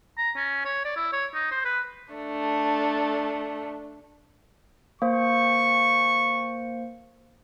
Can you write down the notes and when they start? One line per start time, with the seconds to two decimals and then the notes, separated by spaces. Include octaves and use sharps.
0.18 A#5
0.36 C#4
0.65 C#5
0.85 D5
0.96 E4
1.13 C#5
1.34 D#4
1.51 C5
1.65 B4
2.14 A3 D4
5.02 A#3 C5 C#6